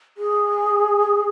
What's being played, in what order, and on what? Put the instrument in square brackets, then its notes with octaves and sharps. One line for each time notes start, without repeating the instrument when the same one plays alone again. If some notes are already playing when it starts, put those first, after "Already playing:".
[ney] G#4